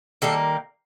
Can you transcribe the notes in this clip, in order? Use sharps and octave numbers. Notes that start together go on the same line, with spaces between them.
D#3 G3 A#3 A4